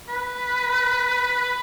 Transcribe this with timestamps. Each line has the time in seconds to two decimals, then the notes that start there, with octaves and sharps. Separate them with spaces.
0.09 B4
1.43 B4